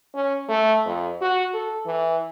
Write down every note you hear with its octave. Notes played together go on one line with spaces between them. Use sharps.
C#4
A3
F2
F#4
A4
E3